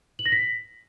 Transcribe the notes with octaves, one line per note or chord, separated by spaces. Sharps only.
F#7
A#6
B6